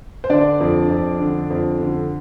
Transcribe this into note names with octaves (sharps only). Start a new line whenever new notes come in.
C5
D3 D4 D5
F2
F2
D3
F2
D3